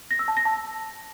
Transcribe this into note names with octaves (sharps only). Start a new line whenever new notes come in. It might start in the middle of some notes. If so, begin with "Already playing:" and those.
A#6
E6
A5
A#6
A5